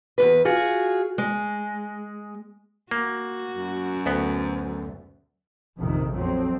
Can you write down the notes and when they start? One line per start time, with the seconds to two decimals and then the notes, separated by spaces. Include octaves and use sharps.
0.18 E2 G#2 B4
0.45 F4 F#4 G#4
1.18 G#3
2.91 A#3 F#4
3.56 F#2
4.06 D2 B3
5.78 A#1 F2 C3 D#3
6.12 F2 F#3 C4